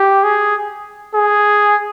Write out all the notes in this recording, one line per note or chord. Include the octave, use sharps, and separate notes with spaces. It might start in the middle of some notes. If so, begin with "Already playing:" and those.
Already playing: G4
G#4
G#4